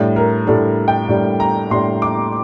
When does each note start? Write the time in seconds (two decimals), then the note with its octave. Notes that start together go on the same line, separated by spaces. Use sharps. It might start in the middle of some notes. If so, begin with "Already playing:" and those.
Already playing: A2 G3 D4
0.16 A#4
0.47 A2 G3 D4 A4
0.88 G5
1.08 A2 G3 D4
1.40 A#5
1.70 A2 G3 D4 C6
2.02 D6